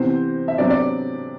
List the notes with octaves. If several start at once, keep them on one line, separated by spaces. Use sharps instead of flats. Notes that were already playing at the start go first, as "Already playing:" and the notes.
Already playing: C3 E3 B3 C5
E5
C3 F#3 B3 D4 D5
D5